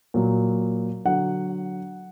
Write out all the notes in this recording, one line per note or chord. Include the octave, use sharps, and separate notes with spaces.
A#2 F#3
D3 F#3 F#5